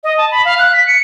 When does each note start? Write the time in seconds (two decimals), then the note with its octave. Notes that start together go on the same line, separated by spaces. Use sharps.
0.04 D#5
0.18 A5
0.31 B5
0.45 F5
0.59 F#6
0.73 B6
0.87 C#7